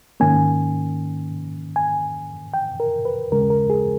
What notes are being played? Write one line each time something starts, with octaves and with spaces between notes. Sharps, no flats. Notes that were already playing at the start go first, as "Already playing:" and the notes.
G#2 D#3 A#3 C#4 G#5
G#5
G5
A#4
B4
D#2 C#3 G#3 C#4 A#4
A#4
G#4